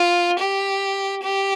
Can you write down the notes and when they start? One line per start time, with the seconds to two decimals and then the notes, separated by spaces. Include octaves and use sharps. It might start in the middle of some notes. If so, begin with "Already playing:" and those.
Already playing: F4
0.39 G4
1.23 G4